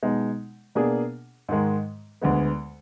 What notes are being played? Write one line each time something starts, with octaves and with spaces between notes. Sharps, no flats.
B2 G#3 D#4
B2 A#3 D4 G#4
G#2 D#3 G#3
D2 D3 G#3 B3